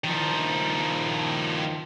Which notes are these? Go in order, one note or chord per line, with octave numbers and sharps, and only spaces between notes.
D#3 F3